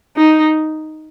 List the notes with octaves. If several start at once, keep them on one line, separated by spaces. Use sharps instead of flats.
D#4